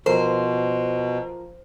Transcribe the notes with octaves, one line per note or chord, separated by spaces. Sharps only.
B2 F3 A#4 C5